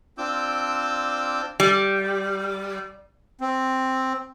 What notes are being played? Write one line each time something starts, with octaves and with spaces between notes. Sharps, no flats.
C4 D4 F4 D6 E6 G6
G3
C4